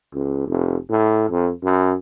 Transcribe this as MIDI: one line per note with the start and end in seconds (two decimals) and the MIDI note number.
0.14 0.42 37
0.47 0.77 29
0.89 1.27 45
1.30 1.51 41
1.63 1.95 42